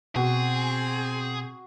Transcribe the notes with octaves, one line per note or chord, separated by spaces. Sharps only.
B2 C4 F#4 G#4 E6